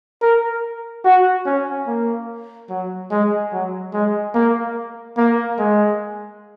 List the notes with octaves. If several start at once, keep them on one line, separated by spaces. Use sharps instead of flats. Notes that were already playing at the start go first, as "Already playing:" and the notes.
A#4
F#4
C#4
A#3
F#3
G#3
F#3
G#3
A#3
A#3
G#3